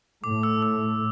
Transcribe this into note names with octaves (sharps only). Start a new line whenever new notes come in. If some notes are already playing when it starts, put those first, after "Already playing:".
A2 A3 D6
E6
E6